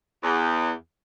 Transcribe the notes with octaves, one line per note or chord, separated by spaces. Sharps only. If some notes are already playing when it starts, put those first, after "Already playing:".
E2